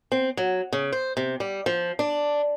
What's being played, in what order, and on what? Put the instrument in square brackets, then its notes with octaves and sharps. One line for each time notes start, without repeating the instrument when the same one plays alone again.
[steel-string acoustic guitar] C4
F#3
C#3
C5
C3
G3
F3
D4